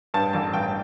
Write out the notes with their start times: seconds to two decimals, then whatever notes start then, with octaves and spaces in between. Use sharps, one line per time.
0.14 G2 A5
0.33 A1 A5
0.53 G2 G5